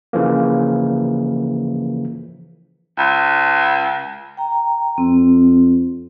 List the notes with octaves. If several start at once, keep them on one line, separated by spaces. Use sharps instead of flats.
C#3 E3 F3 A#3
C#2
G5 A#5
F2 C4